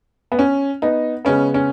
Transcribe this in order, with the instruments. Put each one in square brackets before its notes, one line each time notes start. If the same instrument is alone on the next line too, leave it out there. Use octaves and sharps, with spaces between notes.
[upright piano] B3
C#4
B3 D#4
C#3 G#3 B3 C#4
C#4